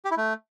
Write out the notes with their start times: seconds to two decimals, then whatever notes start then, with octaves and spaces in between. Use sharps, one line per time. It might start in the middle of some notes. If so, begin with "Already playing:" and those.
0.05 G4
0.11 E4
0.17 A3